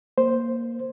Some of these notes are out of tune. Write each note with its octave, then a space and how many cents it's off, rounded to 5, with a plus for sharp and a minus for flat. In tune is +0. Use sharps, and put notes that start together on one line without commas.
A#3 +0 C5 +0